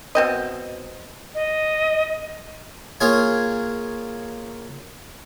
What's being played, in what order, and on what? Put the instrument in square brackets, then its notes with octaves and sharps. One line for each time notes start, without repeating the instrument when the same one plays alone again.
[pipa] B2 C4 D#5
[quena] D#5
[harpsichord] A#3 F4 G#4 C#5 G#5